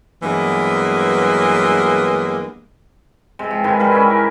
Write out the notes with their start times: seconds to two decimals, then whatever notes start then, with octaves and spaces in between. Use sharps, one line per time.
0.23 G2 E3 F#3 G#3 A#3 B3
3.39 C3 G#3
3.51 F3
3.64 G#2 D#3 B4 G#5
3.79 G#2 G3 B4 F5
3.91 C#4 E4 E5 G#5
4.10 A#4